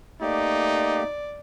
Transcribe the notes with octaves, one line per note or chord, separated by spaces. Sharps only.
A3 A#3 D#4 G4 D5